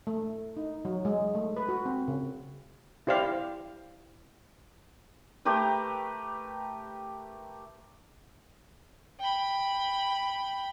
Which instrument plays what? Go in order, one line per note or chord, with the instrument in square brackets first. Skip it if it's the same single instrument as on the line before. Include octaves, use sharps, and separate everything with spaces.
[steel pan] A3
D#4
F#3
G#3
A3
B4
F#4
C4
C#3
E4 G4 C5 D5 F5
[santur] A3 G4 A#4 B4
[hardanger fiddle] G5 B5